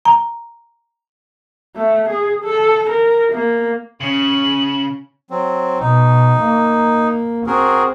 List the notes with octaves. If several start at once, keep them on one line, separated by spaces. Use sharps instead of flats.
A#5
A3
G#4
A4
A#4
A#3
C#3 C#4 F#7
F#3 C4
B2 D#4
A#3
C4 F#4 G#4 A#4